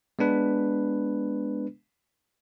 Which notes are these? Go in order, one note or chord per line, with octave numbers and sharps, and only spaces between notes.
G#3 B3 D4 B4